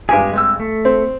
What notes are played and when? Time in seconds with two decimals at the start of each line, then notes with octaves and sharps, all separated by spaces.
0.09 G2 G#3 G4 G#4 G#5
0.34 G#3 C4 E6
0.60 A3
0.85 C4